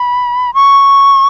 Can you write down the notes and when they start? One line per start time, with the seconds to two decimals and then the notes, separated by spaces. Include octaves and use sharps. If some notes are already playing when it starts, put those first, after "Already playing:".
Already playing: B5
0.54 C#6